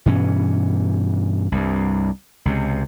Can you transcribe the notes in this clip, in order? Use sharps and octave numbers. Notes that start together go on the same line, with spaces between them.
G2 B2 E3 C#4
C2 G2
C#2 C3